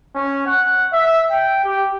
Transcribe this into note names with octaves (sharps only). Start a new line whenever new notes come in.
C#4
F#5
E5
G5
G4